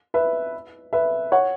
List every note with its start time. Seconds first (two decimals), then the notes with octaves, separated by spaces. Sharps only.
0.14 B4 E5
0.93 B4 E5
1.32 C#5 F#5